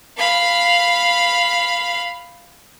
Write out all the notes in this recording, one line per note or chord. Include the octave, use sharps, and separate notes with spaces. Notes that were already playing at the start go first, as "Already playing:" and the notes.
F5 B5